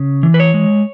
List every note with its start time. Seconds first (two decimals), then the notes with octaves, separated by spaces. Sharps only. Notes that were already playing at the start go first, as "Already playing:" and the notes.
Already playing: C#3
0.23 E3
0.34 B4
0.40 C#5
0.54 G#3